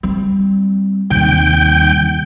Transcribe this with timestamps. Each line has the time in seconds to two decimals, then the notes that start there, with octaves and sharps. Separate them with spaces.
0.03 G3 C4
1.10 D#2 C3 G3 G5